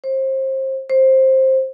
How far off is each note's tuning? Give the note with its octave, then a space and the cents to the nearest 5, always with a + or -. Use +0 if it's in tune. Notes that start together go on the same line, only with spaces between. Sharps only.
C5 +30
C5 +15